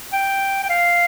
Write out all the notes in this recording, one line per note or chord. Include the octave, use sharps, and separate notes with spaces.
G5
G5
F5